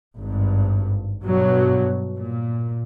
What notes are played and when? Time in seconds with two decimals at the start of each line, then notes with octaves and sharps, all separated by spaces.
0.16 G#1 G2
1.24 G2 B2 F#3
2.17 A#2